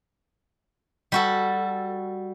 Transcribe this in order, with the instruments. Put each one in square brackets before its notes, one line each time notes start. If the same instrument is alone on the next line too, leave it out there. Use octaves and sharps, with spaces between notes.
[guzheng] G3 F#4 A4